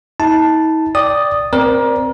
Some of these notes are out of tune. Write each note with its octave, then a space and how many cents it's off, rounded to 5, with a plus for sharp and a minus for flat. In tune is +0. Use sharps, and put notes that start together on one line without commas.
D#4 +45 A5 +0
D5 +0 G5 +0 D#6 -5
C4 +0 A#4 +25 D5 +0